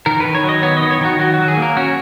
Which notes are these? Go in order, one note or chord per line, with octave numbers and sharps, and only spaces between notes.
D#3 A#4
D#3 B4
C#5
F#3
D#5
B3 C#5
D#3 D#5
C#5
D#3 F#4
F#3 F#4
F#3 F#4
G#4
A#3 A#4
C#4 F#4